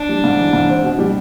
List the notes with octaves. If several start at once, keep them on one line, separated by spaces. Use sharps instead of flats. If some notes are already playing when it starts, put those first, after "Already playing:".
Already playing: D4
G3
G#2
E3
G#2
C4
B2
G3